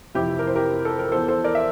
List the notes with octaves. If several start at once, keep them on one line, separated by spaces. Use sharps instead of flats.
F2 C3 E3 E4 G4
A#4
C5
G4 A#4
A4
A#4
E2 E3 A4 C5
A4 C5
A#4 D5
E5